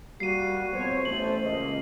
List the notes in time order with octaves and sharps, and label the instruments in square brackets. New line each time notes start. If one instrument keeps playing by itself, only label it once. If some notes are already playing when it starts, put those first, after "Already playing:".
[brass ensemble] G3 A#3 [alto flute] F#4 [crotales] C7 D#7
[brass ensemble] F2 B2 C#5 [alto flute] C5
[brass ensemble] A1 A3 [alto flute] C5 [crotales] F#7
[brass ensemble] C#2 A#3 [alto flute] D#5